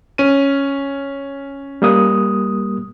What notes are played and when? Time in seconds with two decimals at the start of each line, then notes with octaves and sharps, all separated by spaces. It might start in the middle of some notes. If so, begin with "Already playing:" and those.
0.18 C#4 D#7
1.82 G3 A#3 D#6